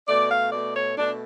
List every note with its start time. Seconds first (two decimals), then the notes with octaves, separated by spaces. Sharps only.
0.08 B2 A3 D5
0.30 F5
0.52 B2 A3 D5
0.75 C#5
0.97 B2 A3 D4